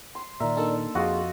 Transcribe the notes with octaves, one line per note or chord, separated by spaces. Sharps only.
C6
A#2 D#3 A#4 D5 E5
A#3 D4 D#4 A4
F2 F4 F#4 G#4 D#5